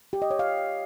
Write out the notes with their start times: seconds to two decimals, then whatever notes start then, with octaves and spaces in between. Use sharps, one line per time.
0.13 G4
0.22 D#5
0.31 C#5
0.39 F5